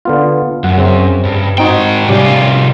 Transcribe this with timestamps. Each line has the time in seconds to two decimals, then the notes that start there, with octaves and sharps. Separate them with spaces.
0.05 D3 B3 F4
0.64 F#2 F#5
0.77 C#3 C4
1.25 G2
1.58 G#2 C4 D#4 F#4 G5
2.09 C2 G3 C#4 F4 G4